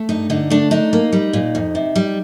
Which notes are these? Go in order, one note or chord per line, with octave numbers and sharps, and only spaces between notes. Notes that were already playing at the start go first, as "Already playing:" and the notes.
Already playing: A3
G2 D#4
D3 D#4
A3 D4
D4 D#4
A#3
G3
A#2
F2
C3
G3